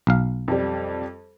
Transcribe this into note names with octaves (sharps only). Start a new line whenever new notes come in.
B1 F5
F2 G3